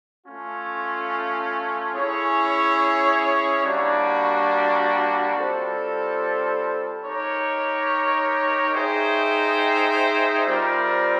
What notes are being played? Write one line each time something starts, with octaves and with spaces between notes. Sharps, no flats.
A3 C#4 F4
C#4 E4 G#4 C#5
G3 A#3 D4 F#4
G3 C4 F4 A4 C5
D#4 G4 A#4 C#5
D#4 G#4 C5 E5 G5
G3 C4 F4 A#4 D5